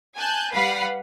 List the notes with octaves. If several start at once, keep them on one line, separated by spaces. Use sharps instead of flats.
G#5 A5 F#6 G6
G3 B4 F5 F#5 B5 C7